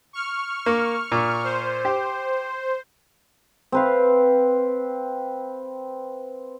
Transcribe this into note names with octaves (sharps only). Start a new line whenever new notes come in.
C#6 F6
A#3
A#2
C5
G4
C4 B4 F5